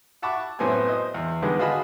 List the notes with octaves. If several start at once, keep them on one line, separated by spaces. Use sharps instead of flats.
E5 F#5 A5 B5 C#6 D6
F#2 A2 B3 C4 C5 G#5
C5 D#5
E2
D3 D#3 G3 G#3 B3
F4 F#4 G#4 D#5 A5 B5